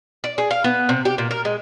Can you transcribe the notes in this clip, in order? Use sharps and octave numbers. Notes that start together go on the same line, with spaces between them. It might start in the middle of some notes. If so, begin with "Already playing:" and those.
D5
G#4
F5
B3
C3
G4
A#2
A#4
G#3